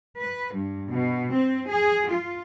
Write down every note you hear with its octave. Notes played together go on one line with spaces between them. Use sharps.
B4
G2
B2
C4
G#4
F4